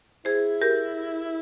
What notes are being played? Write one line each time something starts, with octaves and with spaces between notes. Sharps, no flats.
E4 G#4 C5
G4 A#4